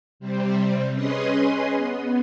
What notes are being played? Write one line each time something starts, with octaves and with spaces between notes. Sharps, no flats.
C3 G3 C4
C#4 G#4 B4 D#5 C6 D#6
B3